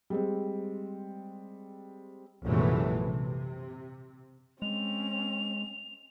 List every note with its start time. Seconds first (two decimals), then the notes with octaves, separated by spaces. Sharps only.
0.10 G3 G#3 C4
2.46 A#1 F#2 C3 E3 G#3 A3
3.03 C3
4.62 G#3 C4 C#4 F7